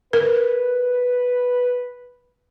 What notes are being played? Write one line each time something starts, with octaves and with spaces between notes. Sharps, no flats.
A#4 B4